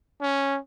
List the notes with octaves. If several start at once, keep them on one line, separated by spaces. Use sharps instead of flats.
C#4